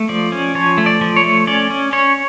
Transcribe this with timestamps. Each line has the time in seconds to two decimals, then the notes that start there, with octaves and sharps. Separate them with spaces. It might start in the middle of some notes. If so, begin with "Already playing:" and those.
Already playing: A3
0.09 F3 D5
0.32 C#4
0.55 F3 C#5
0.78 A3
0.86 D5
1.01 F3
1.16 C#5
1.24 A3
1.47 C#4 D5
1.70 C#4
1.93 C#4 C#5